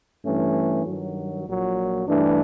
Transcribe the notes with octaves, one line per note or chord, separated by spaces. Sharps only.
G2 E3 A3 C#4
G2 D#3 F#3
A#1 A#2 F#3
G2 E3 A3 D4